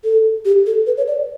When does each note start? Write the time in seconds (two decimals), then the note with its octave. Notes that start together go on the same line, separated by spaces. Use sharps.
0.04 A4
0.45 G4
0.66 A4
0.87 B4
0.97 C#5
1.08 D5